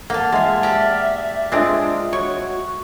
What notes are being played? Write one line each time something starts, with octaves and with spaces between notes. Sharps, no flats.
A#3 F5 F#5 A5
G#3 F4 E5
G4 D5 F5 A#5
G#3 C4 D4 F4 D#5 E5 D#6
F#4 C#5 C#6